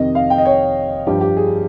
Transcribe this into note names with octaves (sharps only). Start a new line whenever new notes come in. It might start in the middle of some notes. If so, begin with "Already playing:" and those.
Already playing: F2 C3 D#3 D#5
F5
G5
D#5
C#5
G2 F3 G4
G4
G#4